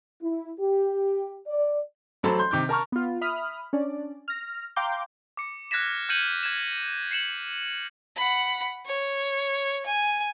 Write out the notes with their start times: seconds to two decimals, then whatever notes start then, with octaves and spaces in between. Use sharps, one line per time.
0.22 E4
0.60 G4
1.47 D5
2.23 A1 F#3 A4 C5 B5
2.39 C6 G6
2.51 C3 D#3 D6 G6
2.69 A#4 A5 C#6 F6
2.92 B3 F4
3.21 E5 B5 D#6 F6
3.73 C#4 D4 D5
4.28 F6 A#6
4.76 F5 G5 A#5 C6 D6 G6
5.37 D6 C#7
5.71 F6 F#6 G#6 A#6 B6 E7
6.09 F6 G6 G#6 C#7 D#7 F#7
6.43 G#6 E7
7.11 C7 C#7 E7 F#7
8.17 F#5 B5
8.86 C#5
9.86 G#5